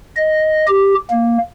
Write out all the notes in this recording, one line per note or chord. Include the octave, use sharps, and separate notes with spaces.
D#5
G4
A#3